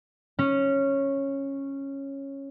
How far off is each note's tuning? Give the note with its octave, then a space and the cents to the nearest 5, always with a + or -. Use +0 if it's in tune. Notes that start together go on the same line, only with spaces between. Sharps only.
C#4 -10